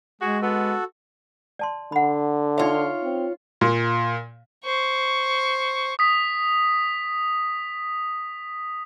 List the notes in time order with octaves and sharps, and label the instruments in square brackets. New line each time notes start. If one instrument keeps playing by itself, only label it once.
[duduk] G#3 [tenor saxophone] F#4 [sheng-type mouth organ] G#4
[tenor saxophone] B3 [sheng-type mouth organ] F#4 A4
[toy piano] D5 A5 C6
[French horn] D3 [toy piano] F#5 B5
[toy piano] D#4 A#4 E5 [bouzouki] F4 C#5
[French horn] C4
[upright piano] A#2
[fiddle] C5 C#6
[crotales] D#6 B6